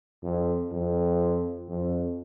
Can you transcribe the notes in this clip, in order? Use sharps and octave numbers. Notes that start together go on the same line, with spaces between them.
F2
F2
F2